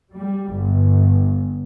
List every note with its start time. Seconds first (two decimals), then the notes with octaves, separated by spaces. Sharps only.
0.14 G3
0.54 G1